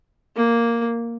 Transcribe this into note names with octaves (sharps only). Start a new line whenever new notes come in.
A#3